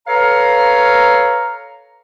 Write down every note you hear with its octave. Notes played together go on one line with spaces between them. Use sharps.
A4 B4 C#5 F5 A#5